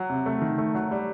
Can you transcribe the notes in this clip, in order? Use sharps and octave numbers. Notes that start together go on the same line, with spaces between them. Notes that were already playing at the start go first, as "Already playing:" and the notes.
Already playing: F#3
C3
A3
D#3
A3
F#3
G3